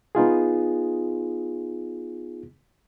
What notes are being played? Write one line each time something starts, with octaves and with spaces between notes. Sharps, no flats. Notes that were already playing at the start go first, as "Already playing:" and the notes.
B3 D#4 F4 G#4